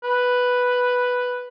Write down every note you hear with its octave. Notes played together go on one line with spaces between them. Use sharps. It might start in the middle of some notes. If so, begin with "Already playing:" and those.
B4